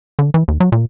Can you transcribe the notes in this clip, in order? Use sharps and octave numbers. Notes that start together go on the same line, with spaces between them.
D3
E3
D#2
F#3
A#2